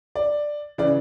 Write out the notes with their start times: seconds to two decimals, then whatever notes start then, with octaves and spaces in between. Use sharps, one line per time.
0.15 D5
0.78 C#3 E3 D5